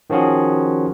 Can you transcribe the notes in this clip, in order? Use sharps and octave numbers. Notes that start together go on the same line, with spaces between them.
D#3 F3 C#4 F#4 G#4